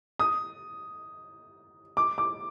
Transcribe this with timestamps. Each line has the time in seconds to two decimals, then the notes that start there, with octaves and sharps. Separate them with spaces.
0.19 D#6
1.97 D6
2.18 D6